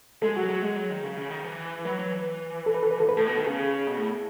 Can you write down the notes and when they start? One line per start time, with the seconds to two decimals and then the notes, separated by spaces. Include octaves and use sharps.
0.22 G#3 A4
0.29 G#4
0.36 F#3 F#4
0.44 G#4
0.49 F#3
0.62 G#3
0.76 F#3
0.90 D#3
1.03 C#3
1.17 C#3
1.30 D#3
1.44 E3
1.85 F#3 B4
1.99 F#3
2.12 E3
2.66 A4
2.74 B4
2.83 A4
2.91 B4
3.00 A4
3.06 G#2 B4
3.17 A2 A4
3.27 B2
3.36 D#3
3.46 C#3 G#4
3.87 B2
3.97 A2